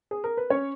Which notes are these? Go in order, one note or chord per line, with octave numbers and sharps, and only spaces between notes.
G#4
A#4
B4
C#4 C#5